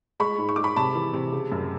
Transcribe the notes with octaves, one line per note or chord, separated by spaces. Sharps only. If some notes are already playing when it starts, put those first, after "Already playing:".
G#3 B5 C#6
G#2
C#6
G#3 D6
B5 C#6
C3 A5 B5
E3
C3
C#3
F#2